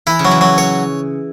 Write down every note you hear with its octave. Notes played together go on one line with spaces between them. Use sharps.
E3 E4
C#3
F#3
E3
F#3
C#5